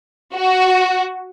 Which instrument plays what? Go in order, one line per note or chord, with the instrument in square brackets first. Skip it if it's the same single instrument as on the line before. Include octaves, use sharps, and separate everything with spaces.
[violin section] F#4